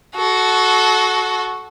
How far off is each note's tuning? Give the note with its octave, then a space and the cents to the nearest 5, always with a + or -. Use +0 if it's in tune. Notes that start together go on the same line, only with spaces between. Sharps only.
F#4 +0 A4 -25